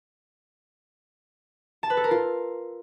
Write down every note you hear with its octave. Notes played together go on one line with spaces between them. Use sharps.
A5
B4
A4
A#4
F4